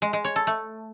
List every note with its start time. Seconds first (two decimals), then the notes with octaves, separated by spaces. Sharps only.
0.02 G#3
0.13 G#3
0.24 C#5
0.36 A4
0.47 A3